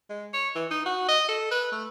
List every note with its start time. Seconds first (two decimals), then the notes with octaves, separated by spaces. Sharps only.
0.10 G#3
0.34 C#5
0.55 E3
0.71 D#4
0.86 F#4
1.09 D#5
1.29 A4
1.51 B4
1.72 A3